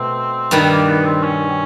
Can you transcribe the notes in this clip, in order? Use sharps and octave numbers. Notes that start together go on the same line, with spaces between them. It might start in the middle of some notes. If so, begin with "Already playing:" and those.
Already playing: B2 A3 C4
G2 D#3 G3 B3
A#3
B3
C4
C#4